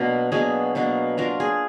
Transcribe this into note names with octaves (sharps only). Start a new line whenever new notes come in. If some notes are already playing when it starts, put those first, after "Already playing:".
Already playing: B2 F#3 A#3 D4
B2 F#3 A#3 D4 G#4
B2 F#3 A#3 D4
F#3 D4 F4 A#4
G#4